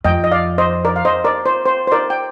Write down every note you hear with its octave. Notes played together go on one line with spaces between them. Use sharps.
F2 D#5 G5
D#5
D5 F5
C5 D#5
A#4 D5
F5
C5 D#5
A#4 D5
C5
C5
C5
A#4 D5
G5